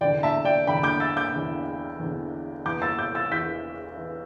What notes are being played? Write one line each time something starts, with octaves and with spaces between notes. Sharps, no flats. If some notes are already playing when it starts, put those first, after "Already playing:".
E2 D3 D5 G5
E5 A5
D5 G5
E2 D3 G5 B5
D6 G6
E6 A6
D6 G6
E2 D3
E2 D3
E2 E3 D6 G6
E6 A6
D6 G6
E6 A6
E2 E3 G6 B6
E3